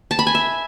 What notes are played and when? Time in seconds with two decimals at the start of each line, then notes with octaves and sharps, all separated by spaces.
0.11 A5
0.19 B5
0.27 G#5
0.35 E5